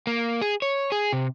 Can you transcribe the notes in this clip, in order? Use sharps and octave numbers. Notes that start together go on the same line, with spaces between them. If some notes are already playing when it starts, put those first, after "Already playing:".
A#3
G#4
C#5
G#4
C3